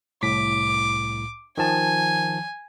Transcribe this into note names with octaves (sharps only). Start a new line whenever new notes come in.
C2 A2 D6 B6
D#3 F3 G#5 A5